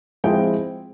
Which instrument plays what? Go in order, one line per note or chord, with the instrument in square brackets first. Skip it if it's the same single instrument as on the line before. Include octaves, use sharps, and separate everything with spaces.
[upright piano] F3 G#3 C4 E4 G5